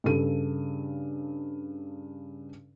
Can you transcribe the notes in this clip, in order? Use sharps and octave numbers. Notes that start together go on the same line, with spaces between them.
G2 C#3 D4 A4 D#7